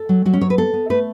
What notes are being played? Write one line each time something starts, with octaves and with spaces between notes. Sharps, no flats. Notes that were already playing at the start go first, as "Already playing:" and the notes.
Already playing: A4
F#3
F#3 F#4
C#4
F#3 C#5
B4
B3 A4
B3
A3 B4